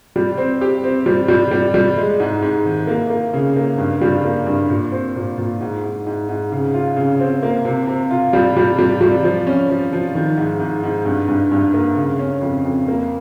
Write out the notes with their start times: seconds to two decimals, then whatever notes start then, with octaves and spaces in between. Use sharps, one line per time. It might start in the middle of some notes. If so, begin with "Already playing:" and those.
0.16 G3
0.38 C4
0.61 G4
0.84 C4
1.06 G3
1.28 G3
1.51 G3
1.74 G3
1.98 G#3
2.20 G#2
2.42 G#2
2.66 D#3
2.87 A#3
3.10 A#3
3.34 C#3
3.56 A#3
3.78 G2
4.01 G3
4.24 A#3
4.47 G2
4.70 A#2
4.92 C4
5.16 A#2
5.38 A#2
5.60 G#2
5.83 G#2
6.06 G#2
6.29 G#2
6.52 C#3
6.74 F4
6.96 C#3
7.20 C4
7.43 A#3
7.65 C3
7.87 C3
8.11 F4
8.33 G3
8.57 G3
8.79 G3
9.01 G3
9.24 F3
9.47 C#4
9.69 F3
9.93 F3
10.15 D#3
10.37 G#2
10.60 G#2
10.83 G#2
11.06 G2
11.28 G2
11.52 G2
11.74 A#3
11.96 C#3
12.19 C#4
12.42 F2
12.65 F2
12.88 A#3